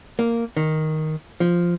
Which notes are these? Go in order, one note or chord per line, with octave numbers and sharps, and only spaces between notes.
A#3
D#3
F3